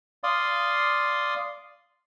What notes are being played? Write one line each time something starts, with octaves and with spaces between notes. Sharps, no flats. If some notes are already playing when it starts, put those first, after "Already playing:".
D5 F5 C6 D#6